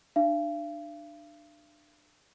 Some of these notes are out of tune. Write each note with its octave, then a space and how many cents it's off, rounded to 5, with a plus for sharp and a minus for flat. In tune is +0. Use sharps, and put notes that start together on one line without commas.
D4 +30 F5 -45